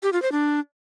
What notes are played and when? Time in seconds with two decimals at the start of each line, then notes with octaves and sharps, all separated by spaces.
0.03 G4
0.13 F4
0.22 C5
0.32 D4